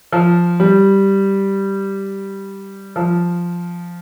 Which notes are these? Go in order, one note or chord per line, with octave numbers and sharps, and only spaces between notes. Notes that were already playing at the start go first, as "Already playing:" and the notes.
F3
G3
F3